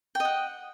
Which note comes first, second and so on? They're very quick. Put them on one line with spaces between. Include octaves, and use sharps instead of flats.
G5 D#5 F#5